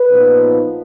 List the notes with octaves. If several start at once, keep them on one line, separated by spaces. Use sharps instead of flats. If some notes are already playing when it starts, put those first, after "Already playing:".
Already playing: B4
A#2 F3 B3 D#4